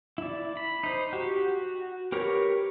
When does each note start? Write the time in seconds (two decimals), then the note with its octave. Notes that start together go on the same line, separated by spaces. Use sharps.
0.18 E4 D5
0.57 B5
0.83 D#4 C5
1.13 F#4 G4
1.48 F#4
2.12 G4 A#4 B4 C#5